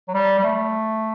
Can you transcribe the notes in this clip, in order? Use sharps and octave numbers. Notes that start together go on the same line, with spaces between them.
F#3
G3
G3
A3